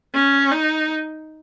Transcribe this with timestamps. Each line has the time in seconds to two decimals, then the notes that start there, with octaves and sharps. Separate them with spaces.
0.14 C#4
0.51 D#4